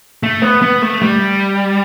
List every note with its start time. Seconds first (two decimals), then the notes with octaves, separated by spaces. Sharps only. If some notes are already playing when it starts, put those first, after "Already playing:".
0.23 A3
0.42 B3
0.62 B3
0.82 A3
1.02 G3